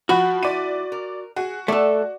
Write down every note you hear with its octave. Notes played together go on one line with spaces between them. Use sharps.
F3 F#4 B5 F#6
F3 E4 D5 D#7
A#4
F#4 G#4
A3 A4 D5